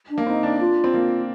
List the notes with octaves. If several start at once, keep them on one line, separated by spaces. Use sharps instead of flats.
D4
A#3
C4 D#4
D4
F4
C4
A#3